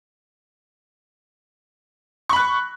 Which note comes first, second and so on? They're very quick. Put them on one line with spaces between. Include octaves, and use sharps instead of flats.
C#6 B5 F#6